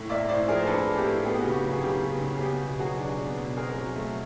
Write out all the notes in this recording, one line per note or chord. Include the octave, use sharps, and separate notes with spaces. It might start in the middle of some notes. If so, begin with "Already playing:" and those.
Already playing: A2
A#3 D5 E5
A2 C5 D5
F3 G#4 A#4
C5
D4 A4 B4
A#3
G4
A2
B3 G#4
G4
F#4
C#3 G4
F#4
F#3
G#4
C#3 G4
B3
C#3
G#4
B3 G4
B2
F#3 F#4 G#4
D4
B3
B2
C4 G#4 A#4
F#3
A3